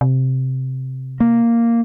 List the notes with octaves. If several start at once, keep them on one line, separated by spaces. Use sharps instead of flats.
C3
A#3